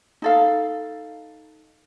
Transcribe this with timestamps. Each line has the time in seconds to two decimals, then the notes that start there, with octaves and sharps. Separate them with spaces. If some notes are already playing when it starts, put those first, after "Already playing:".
0.22 D#4 A4 F5